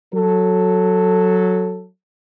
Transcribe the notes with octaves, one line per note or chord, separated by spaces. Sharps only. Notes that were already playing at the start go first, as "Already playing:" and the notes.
F#3 A4